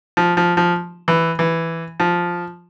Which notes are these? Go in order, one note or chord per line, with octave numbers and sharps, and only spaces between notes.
F3
F3
F3
E3
E3
F3